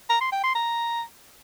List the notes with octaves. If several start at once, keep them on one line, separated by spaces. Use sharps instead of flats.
A#5
C6
G5
C6
A#5